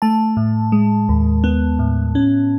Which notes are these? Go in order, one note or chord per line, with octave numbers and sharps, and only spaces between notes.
A3 A5
A2
G#3
D#2
B3
A2
C#4